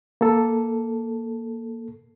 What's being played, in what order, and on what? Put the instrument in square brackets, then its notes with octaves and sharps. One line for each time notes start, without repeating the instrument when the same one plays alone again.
[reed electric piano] A#3 A4